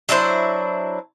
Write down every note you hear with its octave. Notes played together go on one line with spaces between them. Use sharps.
F#3 D4 E4 C5